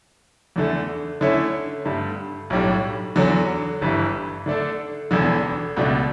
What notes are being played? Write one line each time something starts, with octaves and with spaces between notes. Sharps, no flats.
E2 D3 A3
D3 A3 C#4 E4
G2 D3 A3
B1 A2 G3 D4
E2 D3 F#3
G1 G2 E3
D3 A3 D4 A4
E1 E2 D3
C#2 B2 A3 D4